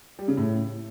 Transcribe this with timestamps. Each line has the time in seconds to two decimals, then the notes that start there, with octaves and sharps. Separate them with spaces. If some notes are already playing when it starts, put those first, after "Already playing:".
0.19 G3
0.28 C#3
0.37 A2